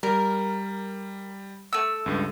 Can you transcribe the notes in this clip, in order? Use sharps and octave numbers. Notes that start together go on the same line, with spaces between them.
G3 A#4
A3 E6
C#2 G2